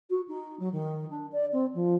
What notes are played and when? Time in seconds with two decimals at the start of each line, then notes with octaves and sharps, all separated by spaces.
0.10 F#4
0.28 D#4
0.59 F#3
0.72 D#3
1.10 D4
1.32 D5
1.52 C4
1.74 F3